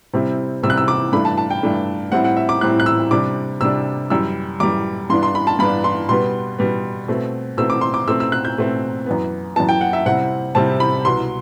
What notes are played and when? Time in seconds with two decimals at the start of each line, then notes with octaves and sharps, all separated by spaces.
0.13 C3 G3 C4 E4
0.63 C3 G3 C4 E4 E6
0.70 F#6
0.78 E6
0.88 D6
1.13 G2 E3 A3 D4 B5
1.25 A5
1.38 A5
1.51 G5
1.63 G2 E3 A3 D4
2.12 A2 G3 C4 E4 F#5
2.24 F#5
2.37 E5
2.49 D6
2.61 A2 G3 C4 E4 F#6
2.80 F#6
2.86 E6
3.11 C3 G3 D4 D6
3.61 C3 G3 D4 E6
4.10 F#2 E3 G3 E6
4.60 F#2 E3 G3 D6
5.10 G2 E3 B3 D4 C6
5.23 C6
5.35 B5
5.47 A5
5.59 G2 E3 B3 D4 B5
5.84 C6
6.09 B2 G3 B3 C6
6.58 B2 G3 B3
7.08 B2 A3 C4
7.57 B2 A3 C4 E6
7.70 D6
7.81 C6
7.94 D6
8.07 B2 A3 C4 E6
8.20 E6
8.32 F#6
8.45 G6
8.57 B2 A3 C4
9.06 F#2 E3 B3
9.56 F#2 E3 B3 A5
9.69 G5
9.81 F#5
9.93 E5
10.06 C3 G3 C4 E4 F#5
10.55 C3 G3 C4 E4 A5
10.80 B5
11.05 C2 B2 F#3 C6